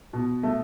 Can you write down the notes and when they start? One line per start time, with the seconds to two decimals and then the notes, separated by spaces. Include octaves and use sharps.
0.13 B2
0.43 A3